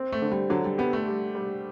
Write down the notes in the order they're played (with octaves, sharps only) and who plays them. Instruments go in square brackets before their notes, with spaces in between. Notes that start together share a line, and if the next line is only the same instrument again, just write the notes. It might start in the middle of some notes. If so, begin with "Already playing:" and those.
Already playing: [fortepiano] C4
[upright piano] A3
[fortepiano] D3
[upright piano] G3
[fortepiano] D3 [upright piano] F#3
[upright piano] G3
[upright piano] B3 [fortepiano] G4
[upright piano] A3
[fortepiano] G3
G3